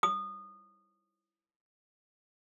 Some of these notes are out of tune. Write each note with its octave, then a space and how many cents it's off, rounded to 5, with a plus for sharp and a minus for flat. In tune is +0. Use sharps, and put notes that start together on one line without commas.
D#6 -25